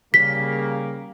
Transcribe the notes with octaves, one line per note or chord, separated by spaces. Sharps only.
C#3 G3 A#3 B6